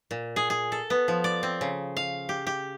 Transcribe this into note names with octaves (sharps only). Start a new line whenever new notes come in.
A#2
G#4
G#4
A4
B3
F3
D5
C4
C#3
F5
G4
G4